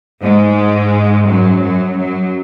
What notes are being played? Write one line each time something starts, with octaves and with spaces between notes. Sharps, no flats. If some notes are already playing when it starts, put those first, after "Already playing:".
G#2 G#3
F#2 F#3
F#2 F#3
F#2 F#3